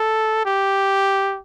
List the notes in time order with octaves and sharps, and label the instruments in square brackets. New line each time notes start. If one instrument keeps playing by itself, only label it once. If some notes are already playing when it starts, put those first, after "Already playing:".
Already playing: [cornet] A4
G4